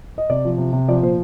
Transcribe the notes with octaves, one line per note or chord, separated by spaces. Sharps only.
D#5
C3 D5
F3
C3
C3
F3 D5
A#2 C5